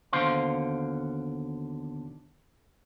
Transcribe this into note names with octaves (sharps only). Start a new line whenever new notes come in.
D#2 B2 D3 C5 F5 C6